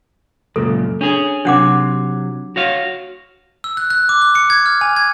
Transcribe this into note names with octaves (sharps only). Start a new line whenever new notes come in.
C#2 F#2 A#2 A4
C#4 D4 G#4
C3 F#3 D4 F#5 D6
F#4 C#5 F5
E6
F#6
F#6
D6
F#6
C#7
G#6
F6
G#5
G#6